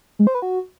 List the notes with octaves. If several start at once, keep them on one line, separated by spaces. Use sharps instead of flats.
G#3
C5
B4
F#4